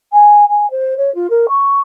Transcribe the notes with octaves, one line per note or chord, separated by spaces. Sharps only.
G#5
G#5
C5
C#5
F4
A#4
C#6